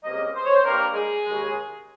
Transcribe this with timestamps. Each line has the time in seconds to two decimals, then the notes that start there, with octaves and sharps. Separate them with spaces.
0.03 C#2 C3 G3 A#3 D#5
0.33 C5
0.46 C#5
0.55 C5
0.64 G2 G3 A#3 A#4
0.94 G#4
1.25 D#2 C#3 G#3